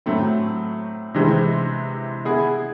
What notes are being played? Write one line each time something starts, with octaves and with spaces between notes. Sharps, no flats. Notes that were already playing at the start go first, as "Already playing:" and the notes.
A2 F#3 A3 C4
C3 E3 G#3 C4
B3 E4 G#4